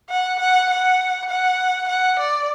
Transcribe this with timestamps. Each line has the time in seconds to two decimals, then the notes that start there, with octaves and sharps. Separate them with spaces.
0.10 F#5
0.39 F#5
0.70 F#5
1.29 F#5
1.88 F#5
2.19 D5